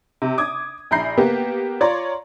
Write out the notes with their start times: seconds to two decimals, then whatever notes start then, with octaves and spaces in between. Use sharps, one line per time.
0.22 C3
0.38 D6 D#6 G#6
0.91 A#1 E4 A#5 B5 G6 C7
1.17 A#3 B3 G4
1.81 F4 C#5 D5 A#5 C6